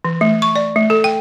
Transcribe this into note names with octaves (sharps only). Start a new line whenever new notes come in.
E3
A3
C#6
D5
A3
A4
G5